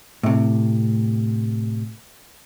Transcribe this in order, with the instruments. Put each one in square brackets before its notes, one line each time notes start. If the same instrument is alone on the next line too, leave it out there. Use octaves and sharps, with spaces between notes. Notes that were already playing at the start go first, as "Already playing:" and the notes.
[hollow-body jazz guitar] A2 C3